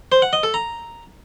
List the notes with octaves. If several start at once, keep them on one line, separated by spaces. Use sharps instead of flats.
C5
F#5
D#5
A4
A#5